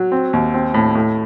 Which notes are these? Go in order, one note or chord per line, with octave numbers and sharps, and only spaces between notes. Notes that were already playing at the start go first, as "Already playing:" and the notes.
Already playing: F#3
C4
D#2
C4
A2
A2